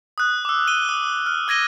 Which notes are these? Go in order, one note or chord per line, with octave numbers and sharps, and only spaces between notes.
D#6 F#6
D6 E6
D#7 G7
D#6
F6
E6 G#6 A#6 D#7 G7